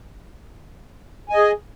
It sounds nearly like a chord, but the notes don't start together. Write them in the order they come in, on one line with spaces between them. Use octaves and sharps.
G#5 D#5 G#4